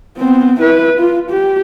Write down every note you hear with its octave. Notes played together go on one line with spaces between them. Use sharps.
B3 C4
E4 B4
F4
G4